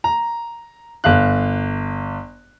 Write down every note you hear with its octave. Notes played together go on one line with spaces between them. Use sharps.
A#5
G1 F5 F#6